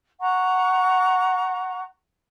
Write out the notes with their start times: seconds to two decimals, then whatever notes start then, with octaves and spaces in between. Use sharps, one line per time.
0.20 F#5 A#5 C#6